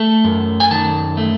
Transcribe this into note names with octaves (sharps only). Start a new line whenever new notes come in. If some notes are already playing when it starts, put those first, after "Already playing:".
Already playing: A3 A5
F#2
G#5
D#3 A5
A3